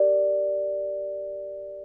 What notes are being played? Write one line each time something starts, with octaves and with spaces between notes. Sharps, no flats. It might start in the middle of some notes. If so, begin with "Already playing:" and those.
Already playing: G4 A#4 D5